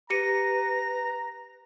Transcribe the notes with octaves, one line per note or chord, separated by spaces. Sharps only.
G4 B4 A#5 A#6 C#7 D#7